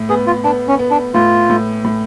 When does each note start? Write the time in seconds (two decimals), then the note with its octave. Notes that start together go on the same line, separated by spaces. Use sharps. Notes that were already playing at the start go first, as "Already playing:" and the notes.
Already playing: A2
0.09 B3 G#4
0.27 F4
0.44 B3 D4
0.68 C#4
0.79 B3
0.91 D4
1.14 A2 F4
1.50 A2
1.84 A2